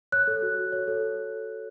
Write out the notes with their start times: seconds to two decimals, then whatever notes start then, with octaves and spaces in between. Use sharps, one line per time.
0.12 C#5 F#6
0.27 A4
0.42 F#4
0.58 F#4
0.72 C#5
0.88 A4